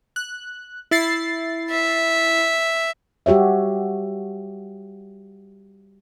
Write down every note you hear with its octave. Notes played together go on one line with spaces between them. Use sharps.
F#6
E4 A6 C7
E5
G3 F#4 G4 C#5 E5